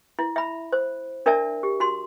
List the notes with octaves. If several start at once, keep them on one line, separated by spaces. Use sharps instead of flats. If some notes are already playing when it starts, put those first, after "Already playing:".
E4
E5 B5
C5
D4 A#4 D5 E5 A5
G4
F#4 C6